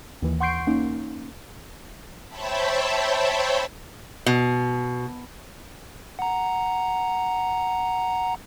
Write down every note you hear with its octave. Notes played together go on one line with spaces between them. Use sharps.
D#2 E3
F#5 C6 C#6 G6 C7 D7
A#3 C#4 D#4
C5 C#5 E5 G5 A5 B5
B2
F#5 A#5